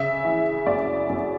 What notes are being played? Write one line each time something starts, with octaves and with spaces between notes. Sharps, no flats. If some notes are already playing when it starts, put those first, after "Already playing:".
Already playing: C#3 E5
E3
F#2 D5
F#2